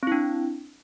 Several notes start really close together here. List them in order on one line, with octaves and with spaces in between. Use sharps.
C4 E4 D4